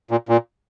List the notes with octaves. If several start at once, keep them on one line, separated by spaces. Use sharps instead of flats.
A#2
A#2